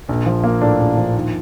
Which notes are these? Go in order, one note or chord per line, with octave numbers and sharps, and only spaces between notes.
A#1
F3
A#3
A2 D4
A#1
F3
D#2